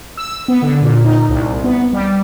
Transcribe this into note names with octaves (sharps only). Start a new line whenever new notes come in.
E6
B3
D3
A#2
D#4
C2
B3
G3